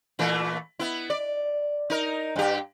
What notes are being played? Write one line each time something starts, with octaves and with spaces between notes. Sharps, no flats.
A#2 E3 A3
B3 E4
D5
D#4 A#4
G2 G4